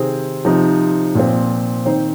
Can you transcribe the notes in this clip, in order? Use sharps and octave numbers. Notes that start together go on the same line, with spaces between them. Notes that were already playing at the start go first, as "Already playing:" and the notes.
Already playing: C3 D#3 C4 G#4 C5
C3 F3 C4 D#4
A#2 F3 C4
D#3 C4 D#4 C5